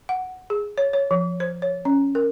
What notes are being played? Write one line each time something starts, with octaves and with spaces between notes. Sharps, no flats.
F#5
G#4
C#5
C#5
F3
C5
C#5
C#4
A#4